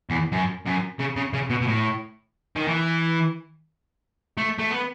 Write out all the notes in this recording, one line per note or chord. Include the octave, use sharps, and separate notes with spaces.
E2
F#2
F#2
C#3
C#3
C#3
B2
B2
A2
D#3
E3
A3
A3
B3